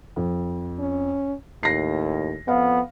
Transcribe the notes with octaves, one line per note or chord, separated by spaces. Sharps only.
F2
C#4
D#2 A2 A#6 C7
F2 B3 F5